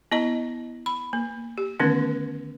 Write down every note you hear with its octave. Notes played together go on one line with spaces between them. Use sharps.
B3 E4 D#5 A#5
B5
A#3
G4
D3 D#3 A3 B3 C#4 D#4